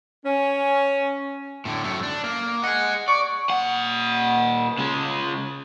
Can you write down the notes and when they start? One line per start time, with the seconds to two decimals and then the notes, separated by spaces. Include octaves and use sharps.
0.25 C#4
1.65 A2 D3
1.83 F#2 A3
2.03 D4
2.24 A#3
2.64 G#4 D#5 F#5
3.08 D5 C#6
3.50 A#2 F#5
4.78 C#3 G#3